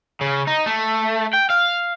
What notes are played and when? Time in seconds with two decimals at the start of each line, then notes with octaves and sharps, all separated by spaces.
0.21 C#3
0.48 D#4
0.66 A3
1.34 G5
1.50 F5